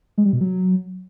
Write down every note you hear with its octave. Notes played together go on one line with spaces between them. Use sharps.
G#3
G3
B2
F#3